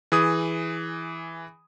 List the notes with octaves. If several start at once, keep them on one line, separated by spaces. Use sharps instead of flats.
E3 G#4 D#6